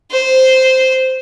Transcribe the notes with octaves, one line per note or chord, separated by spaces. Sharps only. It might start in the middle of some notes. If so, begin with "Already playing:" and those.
C5